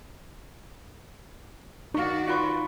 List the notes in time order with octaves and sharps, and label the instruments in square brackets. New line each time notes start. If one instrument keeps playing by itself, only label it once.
[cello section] D#3 F#4 D5 [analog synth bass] D#4 [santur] F5 C#6
[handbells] F4 C6 C#6 [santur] B4 F#5